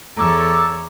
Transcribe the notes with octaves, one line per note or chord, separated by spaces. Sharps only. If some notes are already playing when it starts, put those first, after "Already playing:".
E2 A4 C#5 A#5 D6 E6